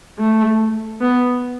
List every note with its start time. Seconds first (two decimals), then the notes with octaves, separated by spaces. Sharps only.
0.18 A3
1.01 B3